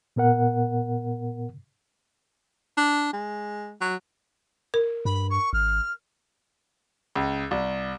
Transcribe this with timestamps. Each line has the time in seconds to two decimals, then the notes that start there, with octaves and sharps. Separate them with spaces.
0.16 A#2 B3 A#4 F#5
2.77 D4
3.13 G#3
3.81 F#3
4.74 A#4
5.05 G2 B5
5.30 C#6
5.53 G#1 F6
7.15 C#2
7.51 C2